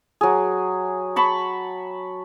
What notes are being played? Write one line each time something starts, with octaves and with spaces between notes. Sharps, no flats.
F#3 G#4
A5 B5 C#6